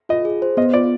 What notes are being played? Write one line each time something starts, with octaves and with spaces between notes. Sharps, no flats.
F4 D#5
G#4
C5
B3 D#5
F4 D5